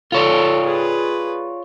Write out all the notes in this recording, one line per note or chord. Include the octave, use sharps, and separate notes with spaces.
F4 A4 C#5 D5
G#4 B4